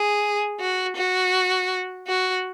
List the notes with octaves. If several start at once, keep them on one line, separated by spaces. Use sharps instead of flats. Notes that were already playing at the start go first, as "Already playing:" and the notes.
Already playing: G#4
F#4
F#4
F#4